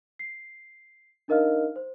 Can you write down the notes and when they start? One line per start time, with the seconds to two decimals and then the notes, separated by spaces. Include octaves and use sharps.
0.19 C7
1.28 D4 D#4 A#4 D#5 F5 F6
1.76 C5